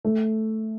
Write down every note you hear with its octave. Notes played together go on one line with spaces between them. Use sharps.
A3